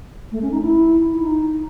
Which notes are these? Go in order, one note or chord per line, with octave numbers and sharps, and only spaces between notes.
A3
C#4
D#4
E4
E4
D#4